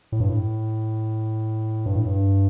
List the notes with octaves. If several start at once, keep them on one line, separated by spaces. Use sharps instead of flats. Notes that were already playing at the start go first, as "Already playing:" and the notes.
A2
G2
A2
G2
A2
G2